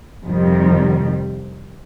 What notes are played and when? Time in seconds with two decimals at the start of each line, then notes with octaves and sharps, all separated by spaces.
0.23 F2 C3 D#3 G3